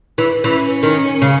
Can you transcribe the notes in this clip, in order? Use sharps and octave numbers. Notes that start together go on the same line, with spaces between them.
E3
E3 C#4
D#3
C#3